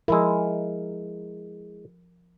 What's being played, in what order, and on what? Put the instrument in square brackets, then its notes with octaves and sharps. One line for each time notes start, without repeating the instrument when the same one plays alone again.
[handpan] F3 A#4 [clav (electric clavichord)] G#3 E4